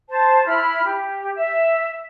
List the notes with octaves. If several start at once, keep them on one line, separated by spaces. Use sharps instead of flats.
C5 A5
E4 B5 F6
G4
E5